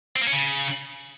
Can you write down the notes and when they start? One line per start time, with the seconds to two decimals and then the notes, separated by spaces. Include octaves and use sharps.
0.16 C4
0.21 A#3
0.27 C#4
0.32 C#3